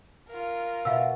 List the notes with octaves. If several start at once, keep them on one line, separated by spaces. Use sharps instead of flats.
F4 A#4
B2 E5 F5 E6